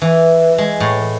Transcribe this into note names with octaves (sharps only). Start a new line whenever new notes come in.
E3
G#3
A2